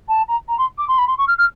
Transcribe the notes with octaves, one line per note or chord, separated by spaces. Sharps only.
A5
A#5
A#5
C6
D6
C6
B5
C6
C#6
F6
F6